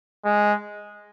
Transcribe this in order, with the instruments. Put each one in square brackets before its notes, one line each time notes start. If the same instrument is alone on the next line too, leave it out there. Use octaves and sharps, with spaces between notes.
[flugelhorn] G#3